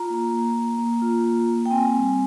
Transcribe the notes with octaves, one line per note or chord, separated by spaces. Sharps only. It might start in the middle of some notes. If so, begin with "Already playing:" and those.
Already playing: F4 A#5
A#3
A#3
A#3
A#3
F4
A#3
A#3
G5
C4 G#5
G3